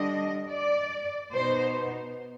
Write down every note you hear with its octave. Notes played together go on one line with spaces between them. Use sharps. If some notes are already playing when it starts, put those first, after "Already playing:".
Already playing: D3 G3 D4 D#5
D5
B2 B3 D#4 C5